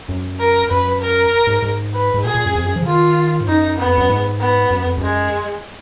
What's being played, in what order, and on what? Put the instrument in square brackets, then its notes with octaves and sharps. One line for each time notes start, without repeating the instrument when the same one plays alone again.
[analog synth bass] F#2
[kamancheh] A#4
[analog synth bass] F#2 [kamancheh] B4
[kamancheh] A#4
[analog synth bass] G#2
G#2
[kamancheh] B4
[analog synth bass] G#2
[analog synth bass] A#2 [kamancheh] G#4
[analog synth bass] A#2
F#2
F2
F#2
F3
C#3
[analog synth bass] D#3 [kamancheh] F4
[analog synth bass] G#2
[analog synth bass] F#2 [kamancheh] D#4
[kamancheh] B3
[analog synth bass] F2
F#2
G#2
[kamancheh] B3
[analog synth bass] F#2
F2
[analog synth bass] F#2 [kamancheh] G#3